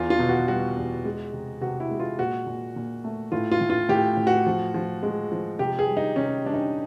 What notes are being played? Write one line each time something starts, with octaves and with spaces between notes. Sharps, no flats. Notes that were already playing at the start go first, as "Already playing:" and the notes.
Already playing: E2 F4
F4
B2
F#4
G3 F#4
E2
G#3
C3
C3 F#4
E4
G#3
F4
A#2 F#4
A#2
A#2
A3
A2 F4
F4
A2
F4
A2 G4
A2
F#4
F3
F3
G#3
F3
C3 G4
G#4
G3
D#4
C3 C#4
G3 D4
D#4